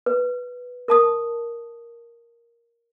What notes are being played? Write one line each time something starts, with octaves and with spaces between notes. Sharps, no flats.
B4
A#4 A5 D#6